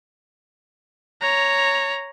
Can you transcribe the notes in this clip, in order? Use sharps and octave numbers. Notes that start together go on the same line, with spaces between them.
C#5 A#5